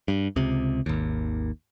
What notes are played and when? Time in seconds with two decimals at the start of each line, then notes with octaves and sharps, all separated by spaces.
0.08 G2
0.36 C#2 C3
0.86 G#1 D#2